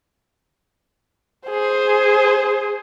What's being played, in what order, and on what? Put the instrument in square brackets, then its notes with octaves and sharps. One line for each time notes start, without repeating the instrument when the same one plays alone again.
[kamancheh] G#4 C5